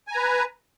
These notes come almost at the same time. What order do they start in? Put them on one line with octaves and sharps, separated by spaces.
G#5 A#5 B4